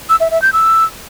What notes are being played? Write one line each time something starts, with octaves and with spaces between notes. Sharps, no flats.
E6
E5
E5
G6
E6